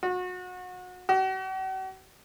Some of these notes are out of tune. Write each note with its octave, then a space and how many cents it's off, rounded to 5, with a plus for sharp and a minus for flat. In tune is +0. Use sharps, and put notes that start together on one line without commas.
F#4 -30
F#4 +45